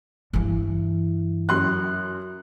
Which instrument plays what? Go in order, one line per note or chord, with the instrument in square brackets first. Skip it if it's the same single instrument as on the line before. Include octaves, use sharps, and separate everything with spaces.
[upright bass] G2 E3
[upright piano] F#2 C6 F#6